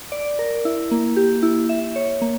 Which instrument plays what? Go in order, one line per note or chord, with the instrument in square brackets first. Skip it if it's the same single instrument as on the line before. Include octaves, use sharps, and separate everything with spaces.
[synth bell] D5
A#4
E4
A#3
G4
E4
E5
C#5
A#3